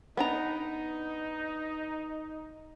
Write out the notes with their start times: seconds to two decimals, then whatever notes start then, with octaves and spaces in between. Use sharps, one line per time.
0.17 B3 D4 D#4 A#5